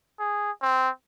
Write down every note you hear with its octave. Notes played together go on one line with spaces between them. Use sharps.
G#4
C4